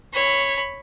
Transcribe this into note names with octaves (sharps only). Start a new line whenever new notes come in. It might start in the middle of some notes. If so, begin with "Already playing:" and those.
C#5 B5